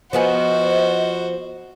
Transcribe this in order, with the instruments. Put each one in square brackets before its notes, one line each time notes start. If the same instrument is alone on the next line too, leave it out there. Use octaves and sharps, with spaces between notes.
[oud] F3 B3 G#4 [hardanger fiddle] F#4 C5 [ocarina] D#5